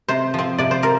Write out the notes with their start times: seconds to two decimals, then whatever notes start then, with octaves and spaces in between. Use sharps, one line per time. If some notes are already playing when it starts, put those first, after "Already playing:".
0.08 C3 C5
0.34 F3 C4
0.58 C3 D5
0.71 C5
0.83 F3 A#4